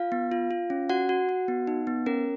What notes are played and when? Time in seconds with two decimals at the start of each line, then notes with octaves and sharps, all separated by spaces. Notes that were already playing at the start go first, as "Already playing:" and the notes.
Already playing: F4 F5
0.12 B3
0.32 F4
0.51 F4
0.70 C#4
0.90 F#4 F#5
1.09 F#4
1.29 F#4
1.48 B3
1.67 D#4
1.87 B3
2.06 C#4 A#4